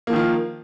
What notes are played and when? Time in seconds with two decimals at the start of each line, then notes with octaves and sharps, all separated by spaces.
0.07 A#3
0.10 F3
0.13 D#3
0.16 F4